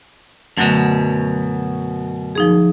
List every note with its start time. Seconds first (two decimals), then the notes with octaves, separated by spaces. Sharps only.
0.57 F#2 B2 D3 F#3 A3
2.35 F3 D#4 G#4